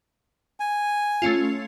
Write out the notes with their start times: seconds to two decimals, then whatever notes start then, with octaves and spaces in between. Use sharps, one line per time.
0.60 G#5
1.22 A3 C#4 F4